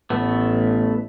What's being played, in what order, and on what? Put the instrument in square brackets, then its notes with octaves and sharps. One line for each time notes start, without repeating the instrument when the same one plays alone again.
[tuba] A1 [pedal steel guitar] A3 B3